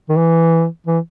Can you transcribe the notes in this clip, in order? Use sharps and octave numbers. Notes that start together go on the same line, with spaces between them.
D#3
E3
E3